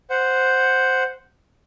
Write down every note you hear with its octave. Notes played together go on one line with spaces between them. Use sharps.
C5 F#5